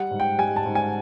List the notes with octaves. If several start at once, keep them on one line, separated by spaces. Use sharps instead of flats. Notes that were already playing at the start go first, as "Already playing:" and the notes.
Already playing: G3 F#5
G#2
G5
G3 G#5
A5
G#2
G#5